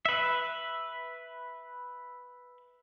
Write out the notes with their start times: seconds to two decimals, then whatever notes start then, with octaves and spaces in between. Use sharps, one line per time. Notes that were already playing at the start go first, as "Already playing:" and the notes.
0.06 B4 E5